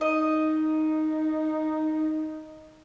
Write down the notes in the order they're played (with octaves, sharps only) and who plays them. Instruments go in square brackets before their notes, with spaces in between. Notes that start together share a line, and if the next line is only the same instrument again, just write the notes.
[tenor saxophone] D#4 [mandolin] D#5